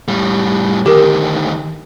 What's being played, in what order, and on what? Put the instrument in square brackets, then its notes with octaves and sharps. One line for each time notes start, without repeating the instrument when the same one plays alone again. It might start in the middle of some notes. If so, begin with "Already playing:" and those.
[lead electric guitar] A2 G3
[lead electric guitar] D2 D#3 [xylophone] G4 A#4